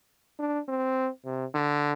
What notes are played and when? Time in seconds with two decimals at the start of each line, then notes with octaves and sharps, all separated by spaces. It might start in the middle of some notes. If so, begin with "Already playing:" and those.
0.40 D4
0.68 C4
1.25 C3
1.54 D3